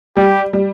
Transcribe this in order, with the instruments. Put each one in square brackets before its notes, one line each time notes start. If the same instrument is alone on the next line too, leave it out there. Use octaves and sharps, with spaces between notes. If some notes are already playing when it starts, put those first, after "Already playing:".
[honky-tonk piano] G3 [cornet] G4
[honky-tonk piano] G3